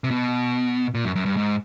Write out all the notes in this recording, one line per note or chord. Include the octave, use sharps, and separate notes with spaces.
C3
B2
A#2
F#2
F#2
G2
G#2